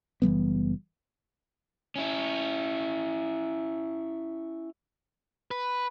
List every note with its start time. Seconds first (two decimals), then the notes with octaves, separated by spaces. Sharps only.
0.22 F#1 E3 G3 B3
1.96 C#4 E4
5.51 B4